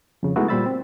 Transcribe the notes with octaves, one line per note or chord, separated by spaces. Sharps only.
F2 C#3
G#3 A3 B3 D#4 E4 F#4
A#2 G3 C5 B5 E6 A6
C4